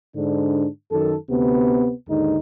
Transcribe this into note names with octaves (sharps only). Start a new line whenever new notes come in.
G#2 D3 D4
F#2 D#3 A4
D2 C3 B3
D#2 G#2 D3 D#4